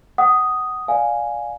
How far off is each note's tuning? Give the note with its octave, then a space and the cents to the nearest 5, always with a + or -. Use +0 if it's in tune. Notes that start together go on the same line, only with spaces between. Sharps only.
F#5 +20 D#6 +0
D5 +0 F5 +15 G#5 +0